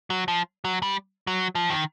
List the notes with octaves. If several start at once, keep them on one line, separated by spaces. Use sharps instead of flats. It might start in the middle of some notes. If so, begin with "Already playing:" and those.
F#3
F3
F#3
G3
F#3
F3
D#3